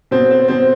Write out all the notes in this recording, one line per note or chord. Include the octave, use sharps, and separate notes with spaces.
B2 C4
C4
B2 C4